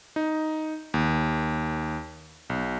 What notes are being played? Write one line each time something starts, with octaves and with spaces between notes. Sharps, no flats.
D#4
D#2
B1